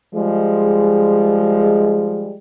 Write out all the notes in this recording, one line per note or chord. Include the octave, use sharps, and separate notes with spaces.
F3 G3 G#3